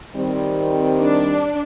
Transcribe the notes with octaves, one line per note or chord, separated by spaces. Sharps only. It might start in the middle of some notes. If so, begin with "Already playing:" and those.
D#3 G3 C4
D4